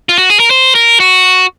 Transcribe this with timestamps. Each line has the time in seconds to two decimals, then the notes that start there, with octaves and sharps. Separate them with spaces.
0.09 F4
0.18 F#4
0.30 G#4
0.40 A#4
0.50 C5
0.75 A#4
1.00 F#4